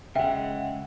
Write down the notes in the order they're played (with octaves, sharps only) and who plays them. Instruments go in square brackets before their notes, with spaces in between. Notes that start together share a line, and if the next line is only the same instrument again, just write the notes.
[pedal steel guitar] C#3 G#3 [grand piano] E5 [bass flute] F#5 [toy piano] G5